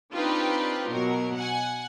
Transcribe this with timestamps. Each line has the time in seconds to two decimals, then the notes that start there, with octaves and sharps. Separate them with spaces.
0.14 C4 D4 D#4 F4 G4 B4
0.90 B2 F#3 A#4
1.37 F#5 G#5